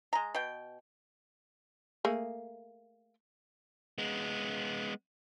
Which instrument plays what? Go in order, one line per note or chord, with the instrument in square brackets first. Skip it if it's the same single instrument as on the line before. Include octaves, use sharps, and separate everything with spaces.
[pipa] G#3 A#5
B2 G5
[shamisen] A3 A#3 G#4
[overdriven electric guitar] G#3 B3